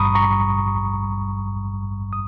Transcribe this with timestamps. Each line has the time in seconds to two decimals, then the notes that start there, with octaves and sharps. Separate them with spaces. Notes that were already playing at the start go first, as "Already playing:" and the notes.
Already playing: G#1 G2 G3 A#5 B5 C#6 D#6
0.15 A#5 C#6
2.13 D#6